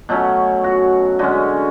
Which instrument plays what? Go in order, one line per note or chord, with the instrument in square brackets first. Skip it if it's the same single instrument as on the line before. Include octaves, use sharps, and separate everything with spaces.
[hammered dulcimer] B2 F#3 A3 C#4
F#4
D3 G#3 C#4 F#4